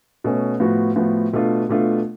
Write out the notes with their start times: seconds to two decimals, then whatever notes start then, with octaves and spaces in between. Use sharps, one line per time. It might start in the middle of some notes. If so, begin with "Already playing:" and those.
0.24 B2 A3 C#4
0.60 A2 F3 B3 F#4
0.96 A2 F3 B3 F#4
1.33 B2 A3 D4 F4
1.69 B2 A3 D4 F4